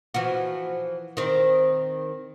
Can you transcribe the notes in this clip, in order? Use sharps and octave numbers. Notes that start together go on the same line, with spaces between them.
E3 F3 F#4
D#3 C4